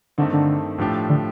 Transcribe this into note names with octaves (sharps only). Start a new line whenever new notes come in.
G2 D3 D#3 A3 C4 D#4
D3
A2 F3 A3 D4 G4
D3